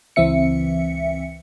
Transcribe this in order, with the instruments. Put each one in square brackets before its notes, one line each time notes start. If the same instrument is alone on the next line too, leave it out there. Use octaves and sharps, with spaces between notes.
[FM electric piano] C#2 E3 C4 E5 C#7